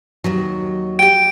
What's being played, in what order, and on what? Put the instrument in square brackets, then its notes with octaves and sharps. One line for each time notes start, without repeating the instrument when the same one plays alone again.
[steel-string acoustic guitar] D#2 D#3 F#3
[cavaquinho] G4 G5 [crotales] D7